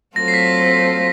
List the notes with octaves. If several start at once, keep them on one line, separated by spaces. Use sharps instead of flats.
F#3 A3 C4 F4 A4 A#6
C7
B6